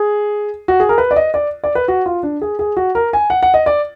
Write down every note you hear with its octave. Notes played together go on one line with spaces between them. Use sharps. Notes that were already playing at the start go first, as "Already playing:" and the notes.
Already playing: G#4
F#4
G#4
A#4
B4
D5
D#5
D5
D5
B4
F#4
F4
D4
G#4
G#4
F#4
A#4
G#5
F#5
F#5
D#5
D5